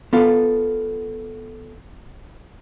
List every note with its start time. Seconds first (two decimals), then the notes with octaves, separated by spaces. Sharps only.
0.13 B3 F4 A4 F5